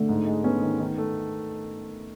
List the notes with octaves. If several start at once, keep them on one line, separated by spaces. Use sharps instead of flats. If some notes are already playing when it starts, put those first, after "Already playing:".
Already playing: D3 A3
G#2
G#3
B3 C#4
D#3
D#3
A3